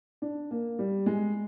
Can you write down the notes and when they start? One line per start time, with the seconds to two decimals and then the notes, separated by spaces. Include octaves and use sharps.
0.22 D4
0.51 A#3
0.79 G3
1.06 G#3